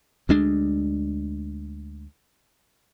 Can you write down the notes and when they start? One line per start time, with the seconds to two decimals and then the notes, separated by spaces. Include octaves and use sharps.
0.29 D2 G#3 D4